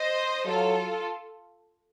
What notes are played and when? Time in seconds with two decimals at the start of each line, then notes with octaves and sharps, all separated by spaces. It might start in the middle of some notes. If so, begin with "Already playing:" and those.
Already playing: C5 D#5
0.47 F#3 F4 A4